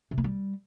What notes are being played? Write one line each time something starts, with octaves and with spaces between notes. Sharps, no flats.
C3
A#3
G3